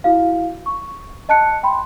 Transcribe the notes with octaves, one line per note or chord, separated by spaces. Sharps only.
E4 F#4 F5
C#6
D#5 A5 F#6 C#7
G5 B5 C6